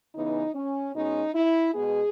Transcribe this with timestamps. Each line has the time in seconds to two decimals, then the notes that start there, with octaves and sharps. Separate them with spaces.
0.15 C#3 E3 B3 D#4
0.55 C#4
0.94 B2 G#3 C#4 D#4
1.34 E4
1.74 B2 G#3 B3 G#4